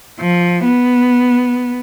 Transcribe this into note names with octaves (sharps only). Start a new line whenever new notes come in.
F3
B3